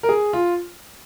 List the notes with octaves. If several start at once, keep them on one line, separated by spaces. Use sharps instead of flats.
A#4
G#4
F4